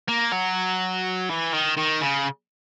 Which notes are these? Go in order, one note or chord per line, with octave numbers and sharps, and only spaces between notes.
A#3
F#3
E3
D#3
D#3
C#3